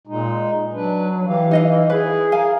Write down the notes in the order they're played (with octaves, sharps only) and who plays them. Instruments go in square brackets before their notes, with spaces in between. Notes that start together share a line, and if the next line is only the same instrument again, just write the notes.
[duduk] A#2 [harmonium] G#3 D#4
[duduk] F#3 [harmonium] D4 B4
[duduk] E3 [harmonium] G4 F5
[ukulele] D#4 D#5 F5 [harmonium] E4
[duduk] G#4 [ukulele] B4
[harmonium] A#4 [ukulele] F5 G#5